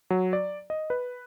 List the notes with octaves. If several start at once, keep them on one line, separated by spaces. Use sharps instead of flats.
F#3
D5
D#5
B4